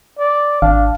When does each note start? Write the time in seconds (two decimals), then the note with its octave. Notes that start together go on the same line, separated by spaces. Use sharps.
0.18 D5
0.62 G#1 D4 F5